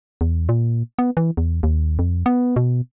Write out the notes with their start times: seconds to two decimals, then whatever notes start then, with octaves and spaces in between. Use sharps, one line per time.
0.21 E2
0.49 A#2
0.99 B3
1.17 E3
1.37 E2
1.63 D#2
1.99 F2
2.26 B3
2.56 B2